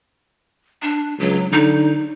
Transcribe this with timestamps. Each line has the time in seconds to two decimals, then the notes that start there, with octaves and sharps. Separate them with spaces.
0.82 D4
1.19 C#2 F#3
1.52 D3 D#4